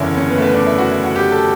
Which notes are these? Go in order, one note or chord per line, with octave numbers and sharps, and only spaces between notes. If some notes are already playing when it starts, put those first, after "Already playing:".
Already playing: F#1 E2 D3 C#4 E4
C#4
B3
A3
B3
D4
E4
F#4
E4
F#4
G4
A4